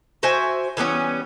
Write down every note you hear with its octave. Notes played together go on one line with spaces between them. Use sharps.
F#4 C5 E5 G#5
E3 G3 B3 C#4